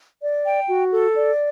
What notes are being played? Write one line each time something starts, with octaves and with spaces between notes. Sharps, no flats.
D5
G5
F#4
A4
D5